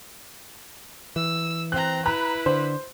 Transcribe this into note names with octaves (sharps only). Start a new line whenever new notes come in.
E3 E6
C4 A#5 F#6
E4 B4 A#5 B5 F#6
D3 C5